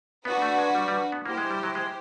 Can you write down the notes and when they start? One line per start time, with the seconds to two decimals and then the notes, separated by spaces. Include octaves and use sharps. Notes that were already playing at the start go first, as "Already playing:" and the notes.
0.25 B3 D4 F#4 B4
0.42 A3
0.58 G#3
0.75 G3
0.88 G3
1.12 B3
1.25 A#3 E4 G4 C5
1.38 G#3
1.51 G3
1.63 F#3
1.75 G#3